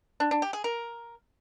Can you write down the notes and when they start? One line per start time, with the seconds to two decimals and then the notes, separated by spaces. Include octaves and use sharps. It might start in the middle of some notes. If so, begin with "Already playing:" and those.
0.20 D4
0.31 D4
0.42 G4
0.53 G#4
0.64 A#4